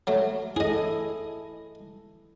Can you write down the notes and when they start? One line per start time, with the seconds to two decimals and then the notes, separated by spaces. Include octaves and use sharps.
0.07 F#3 A3
0.56 E4 G#4 A4 D#5